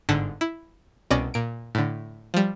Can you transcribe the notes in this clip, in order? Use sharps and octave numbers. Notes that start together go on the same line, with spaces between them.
G1 G#2 D3 F#5 A5 B6
E4
C2 B2 C#4 D5 A#6
A#2 D7
A2 D3
F3 G3